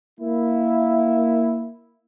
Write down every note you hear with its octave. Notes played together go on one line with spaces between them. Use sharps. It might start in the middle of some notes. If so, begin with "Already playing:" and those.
A#3 E4